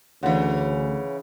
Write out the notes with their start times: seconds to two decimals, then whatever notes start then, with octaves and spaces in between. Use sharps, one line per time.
0.23 D2 C#3 E3 C#5 F#5 C6